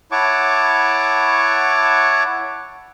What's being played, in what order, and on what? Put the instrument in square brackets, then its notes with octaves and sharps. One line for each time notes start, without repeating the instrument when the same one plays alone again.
[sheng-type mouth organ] E4 C#5 F#5 A5 C#6 D6